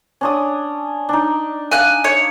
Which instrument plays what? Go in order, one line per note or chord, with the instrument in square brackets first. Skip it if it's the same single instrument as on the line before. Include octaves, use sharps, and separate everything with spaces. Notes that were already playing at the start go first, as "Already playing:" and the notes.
[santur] C#4 D4 D#6
D4 D#4
[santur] F5 [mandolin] G#5 F#6
[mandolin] C#5